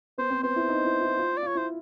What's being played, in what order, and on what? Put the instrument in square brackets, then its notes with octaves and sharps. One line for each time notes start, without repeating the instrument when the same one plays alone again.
[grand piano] B3 [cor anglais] C5
[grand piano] C4
[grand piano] B3 [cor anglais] C5
[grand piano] E4
D#4
E4
E4
F4
[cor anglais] D5
[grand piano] F4 [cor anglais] C#5
[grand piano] E4 [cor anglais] C5